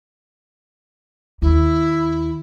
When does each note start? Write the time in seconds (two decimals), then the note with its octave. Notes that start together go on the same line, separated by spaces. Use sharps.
1.42 D#2 E4